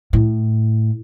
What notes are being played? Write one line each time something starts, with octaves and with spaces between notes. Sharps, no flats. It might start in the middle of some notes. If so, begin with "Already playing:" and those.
A2